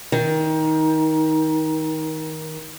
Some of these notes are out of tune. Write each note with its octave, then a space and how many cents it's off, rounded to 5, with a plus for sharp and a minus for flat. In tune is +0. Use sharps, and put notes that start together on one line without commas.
D#3 +20